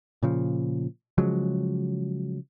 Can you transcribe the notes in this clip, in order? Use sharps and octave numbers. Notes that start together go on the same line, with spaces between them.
A#2 C#3 F3
C#3 F3 F#3 G#3